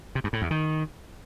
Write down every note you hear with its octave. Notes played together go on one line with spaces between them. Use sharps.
C3
G2
A2
E2
D#3